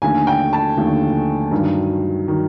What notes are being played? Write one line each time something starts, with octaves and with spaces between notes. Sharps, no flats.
D#2 D3 F3 A3 G#5
G5
A5
D#2 D3 F3 A3
G2 D#3 F#3
D#3 F#3